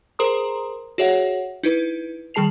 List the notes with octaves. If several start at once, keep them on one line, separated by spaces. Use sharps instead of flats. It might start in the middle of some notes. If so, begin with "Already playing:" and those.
G#4 A#4 C5 A#5 C6 D#6
F#4 G#4 C#5 E5 F#5
D#4 E4 B4
D#3 G3 G#4 A5 C7 F7